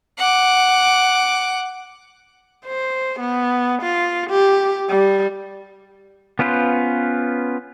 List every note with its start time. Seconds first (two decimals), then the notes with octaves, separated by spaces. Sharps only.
0.18 F#5 D6
2.66 C5
3.20 B3
3.82 F4
4.30 G4
4.90 G3
6.39 B3 C#4 F4 B4 C5